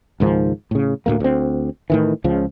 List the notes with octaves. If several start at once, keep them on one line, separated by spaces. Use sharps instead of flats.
C#2 G#2 D#3 F3
A2 C#3
D2 A2 A3 A#3
D2 C4
A2 D#3 E3
C#2 C#3 F3